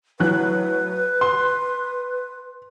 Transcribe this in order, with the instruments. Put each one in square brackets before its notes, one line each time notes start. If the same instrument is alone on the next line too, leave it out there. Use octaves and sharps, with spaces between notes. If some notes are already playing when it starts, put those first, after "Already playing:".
[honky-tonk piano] A2 F#3 F#6 [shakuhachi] B4
[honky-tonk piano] C6